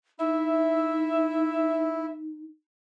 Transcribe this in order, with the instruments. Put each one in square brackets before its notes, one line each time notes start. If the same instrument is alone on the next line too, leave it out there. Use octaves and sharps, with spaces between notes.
[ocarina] D#4 [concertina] E4 [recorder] E5